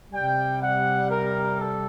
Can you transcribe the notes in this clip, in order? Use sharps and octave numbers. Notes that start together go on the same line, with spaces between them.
C3 G3 G5
F#5
A#4
A4